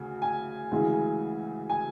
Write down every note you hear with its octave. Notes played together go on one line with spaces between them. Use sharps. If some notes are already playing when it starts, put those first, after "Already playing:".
Already playing: D2 C#3
G#5
D2 C#3 E3 G#3
G#5